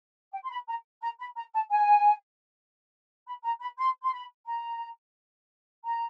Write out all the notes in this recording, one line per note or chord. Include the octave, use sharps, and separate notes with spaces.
G5
C6
B5
A#5
A#5
B5
A#5
A5
G#5
B5
A#5
B5
C6
C6
B5
A#5
A#5